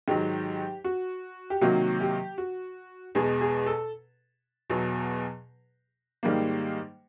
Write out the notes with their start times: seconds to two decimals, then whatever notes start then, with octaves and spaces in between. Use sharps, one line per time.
0.08 G#2 D#3 F#3 G4
0.84 F#4
1.50 G4
1.61 C3 D#3 F#3 A#3 F#4
2.00 G4
2.38 F#4
3.15 E2 B2 G#3 G#4
3.41 G#4
3.66 A4
4.70 E2 B2 F#3
6.23 G#2 D#3 G3 A#3